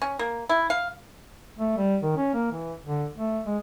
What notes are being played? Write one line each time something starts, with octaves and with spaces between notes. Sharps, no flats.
C#4
A#3
E4
F5
A3
G3
D#3
C#4
A#3
E3
D3
A3
G#3